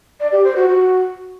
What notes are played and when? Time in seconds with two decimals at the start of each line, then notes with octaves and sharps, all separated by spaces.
0.20 D5
0.32 G4
0.44 C5
0.56 F#4
0.68 F#4